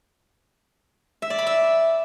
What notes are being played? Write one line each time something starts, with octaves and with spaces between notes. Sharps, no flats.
E5
D5
B5
E5